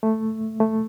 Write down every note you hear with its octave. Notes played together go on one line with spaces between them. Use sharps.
A3
A3